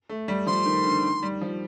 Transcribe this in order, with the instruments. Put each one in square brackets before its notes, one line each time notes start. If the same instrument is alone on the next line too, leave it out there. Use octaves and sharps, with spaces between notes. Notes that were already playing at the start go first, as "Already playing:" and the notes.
[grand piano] A3
G3
[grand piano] F3 [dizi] C6
[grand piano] D#3
D3
D#3
G3
F3